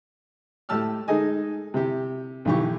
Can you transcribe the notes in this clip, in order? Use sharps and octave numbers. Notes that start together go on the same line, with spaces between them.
A2 A3 G4 A5 E6 F6
G#3 D#4 G#4 A4 D#5 G#5
C3 E4 G4
B1 D#3 E3 G4 C#6